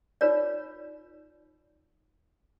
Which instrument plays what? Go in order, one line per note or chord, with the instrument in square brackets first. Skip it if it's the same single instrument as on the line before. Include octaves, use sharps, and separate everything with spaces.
[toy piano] D#4 F4 A#4 C#5 D5